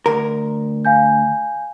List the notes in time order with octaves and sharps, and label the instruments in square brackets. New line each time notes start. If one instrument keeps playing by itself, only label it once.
[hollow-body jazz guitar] D2 A#4
[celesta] F5 G#5 G6